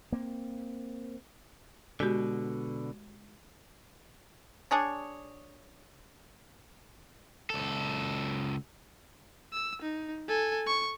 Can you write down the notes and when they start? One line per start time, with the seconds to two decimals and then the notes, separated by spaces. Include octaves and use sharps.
0.12 A#3 C4
2.00 B2 D3 G#3 F#4 G4
4.71 D4 G#4 C#5
7.50 C#2 A4
9.53 E6
9.82 D#4
10.28 A4 G#5
10.67 C#6